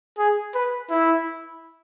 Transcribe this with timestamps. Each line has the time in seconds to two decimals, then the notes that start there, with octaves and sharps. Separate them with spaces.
0.18 G#4
0.55 B4
0.90 E4